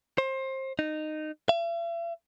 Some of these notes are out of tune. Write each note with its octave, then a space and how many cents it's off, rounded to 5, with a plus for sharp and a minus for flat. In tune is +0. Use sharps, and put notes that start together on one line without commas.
C5 +25
D#4 -15
E5 +45